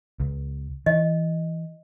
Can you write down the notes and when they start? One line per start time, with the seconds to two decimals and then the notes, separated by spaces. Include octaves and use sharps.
0.20 C#2
0.86 E3 D#5